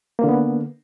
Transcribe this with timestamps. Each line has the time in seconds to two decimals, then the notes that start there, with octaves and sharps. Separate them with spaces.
0.19 A#3
0.24 D3
0.29 B3